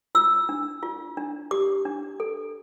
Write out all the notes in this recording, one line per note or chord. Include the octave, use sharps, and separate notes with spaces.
F4 E6
D4
F4
D4
G4 D6
D4
A4